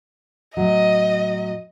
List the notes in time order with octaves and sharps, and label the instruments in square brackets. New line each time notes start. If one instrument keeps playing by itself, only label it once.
[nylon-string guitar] A2 F#3 [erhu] D#5